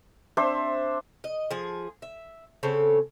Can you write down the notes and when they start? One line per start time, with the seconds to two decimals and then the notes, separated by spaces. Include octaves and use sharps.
0.37 C4 D4 C5 E5
1.24 D#5
1.51 F3 G#4
2.02 E5
2.63 C#3 C4 A4 C#5